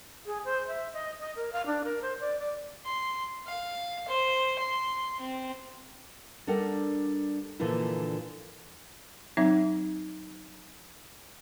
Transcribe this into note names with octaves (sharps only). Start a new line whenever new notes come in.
G#4
C5
E5
D#5
D#5
A#4
F5
D4
A#4
C5
D5
D5
C6
F5
C5
C6
C4
G3 D4 A4 A#4 F#5
A#2 D3 E3 F3 E4
F#3 C4 D#4 E5